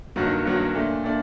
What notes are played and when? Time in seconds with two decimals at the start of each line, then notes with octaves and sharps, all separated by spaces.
0.16 G2 D#3 F#3 A#3 F#4
0.45 G2 D#3 F#3 A#3 F#4
0.75 A#2 A3 D4
1.04 A#2 A3 D4